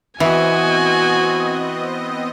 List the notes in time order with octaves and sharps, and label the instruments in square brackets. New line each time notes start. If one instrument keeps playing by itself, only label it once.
[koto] E3 [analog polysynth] B3 C4 D#5 [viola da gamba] F#4 [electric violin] G#5